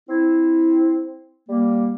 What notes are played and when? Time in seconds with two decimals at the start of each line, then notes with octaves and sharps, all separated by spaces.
0.09 C4 E4
1.48 G3 A#3